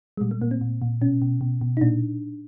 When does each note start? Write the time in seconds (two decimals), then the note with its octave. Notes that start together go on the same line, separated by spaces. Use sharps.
0.17 G#3
0.21 A#2 G3
0.31 A3
0.42 A#2 A#3
0.51 C4
0.61 A#2
0.82 A#2
1.01 B2 C#4
1.22 B2
1.41 B2
1.61 B2
1.77 D#4
1.81 A#2 D4